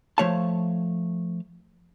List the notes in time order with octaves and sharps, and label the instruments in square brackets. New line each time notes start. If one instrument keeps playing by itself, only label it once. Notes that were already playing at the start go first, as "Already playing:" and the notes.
[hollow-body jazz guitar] F3 A3 C#5 F5 A5